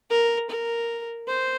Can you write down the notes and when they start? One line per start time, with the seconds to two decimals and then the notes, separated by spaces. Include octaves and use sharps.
0.10 A#4
0.50 A#4
1.27 C5